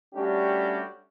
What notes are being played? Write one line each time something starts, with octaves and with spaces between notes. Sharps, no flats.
G3 A3 C#4 D4 F#4 G4